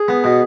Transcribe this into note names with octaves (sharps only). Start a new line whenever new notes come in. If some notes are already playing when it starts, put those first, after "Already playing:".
Already playing: G#4
B3
B2